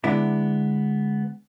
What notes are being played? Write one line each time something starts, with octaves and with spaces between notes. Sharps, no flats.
D3 G#3 B3 D4 E4 E5